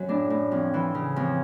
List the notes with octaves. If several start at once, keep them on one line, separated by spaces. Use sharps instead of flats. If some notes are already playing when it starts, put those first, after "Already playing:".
Already playing: F#2 F#3
A2 D4
A2
F2
E3
C#3
F2